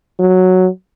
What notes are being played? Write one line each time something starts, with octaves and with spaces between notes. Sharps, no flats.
F#3